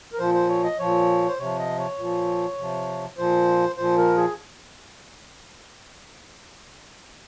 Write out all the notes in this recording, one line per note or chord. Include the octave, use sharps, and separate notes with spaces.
A#4
A#2 F3 C5
C5
C#5
D#5
A#2 F3 C#5
C5
C3 F3 C#5
D#5
C#5
A#2 F3
C3 F3
A#2 F3 C5
A#2 F3 C5
A#4
G#4